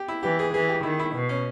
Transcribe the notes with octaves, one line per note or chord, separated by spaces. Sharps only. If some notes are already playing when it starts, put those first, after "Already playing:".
Already playing: G4
E4
E3 G4
G#4
E3 G#4
G4
D#3 E4
E4
B2
C#4